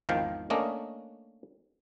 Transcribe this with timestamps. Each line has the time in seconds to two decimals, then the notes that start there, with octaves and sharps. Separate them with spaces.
0.09 G#1 E2 D#3 F3 F5 G5
0.50 A3 A#3 C#4 D4 D#5